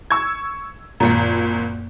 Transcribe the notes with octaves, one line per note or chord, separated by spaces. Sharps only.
C#6 E6 G#6
G#1 F#2 A#2 A#3